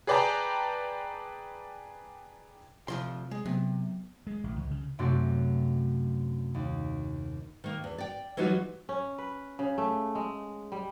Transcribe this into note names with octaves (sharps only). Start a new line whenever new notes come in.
G#4 B4 D5 G5 A5 A#5
D2 C3 F3 C6
G#3
C3 F#3 B3
G#3
A1
C#2
C#3
F#2 C3 A3 C4 D4 F#4
D#2
D#3 A#3
E2
D5 G5
E3 F#3 G3 D#4 F4 F#4
C#4
B4
C#3
A3
G#3
G3